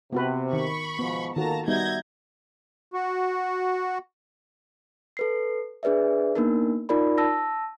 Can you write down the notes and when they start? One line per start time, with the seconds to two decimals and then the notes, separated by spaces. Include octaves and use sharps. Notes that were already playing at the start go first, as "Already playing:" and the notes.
0.13 C3 B3 F#4 B4
0.53 D#3 B5 C#6
0.99 G#2 B2 F3 B3
1.36 D#3 A#3 F4 F#4 A4 A5 A#5 A#6
1.68 G3 B3 D#4 F#4 E5 G6 G#6 A#6
2.93 F#4
5.17 A4 B4 C7
5.83 D4 G#4 B4 D5 E5
6.35 A#3 B3 D4 D#4 A#4
6.89 D#4 F4 A#4 D5 B5
7.18 A5 E6 A#6